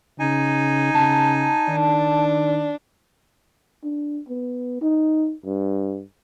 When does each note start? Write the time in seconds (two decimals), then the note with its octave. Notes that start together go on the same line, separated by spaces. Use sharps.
0.19 C#3 D#4 G#5
0.94 C#3 A5
1.69 D#3 D4
3.84 D4
4.29 B3
4.82 D#4
5.45 G2